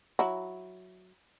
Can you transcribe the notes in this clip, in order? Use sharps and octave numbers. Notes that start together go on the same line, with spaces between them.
F#3 E4